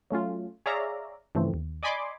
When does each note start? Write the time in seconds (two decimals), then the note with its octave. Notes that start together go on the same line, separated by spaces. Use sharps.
0.11 F#3 A3 C#4 F4
0.66 G#4 C#5 D5 E5 F5 A#5
1.35 G2 C#3 E3 F3 A3 C4
1.54 D#2
1.83 D5 D#5 G#5 B5 C6 D6